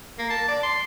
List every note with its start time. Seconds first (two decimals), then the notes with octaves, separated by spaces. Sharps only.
0.18 A#3
0.30 A5
0.48 D5
0.63 C6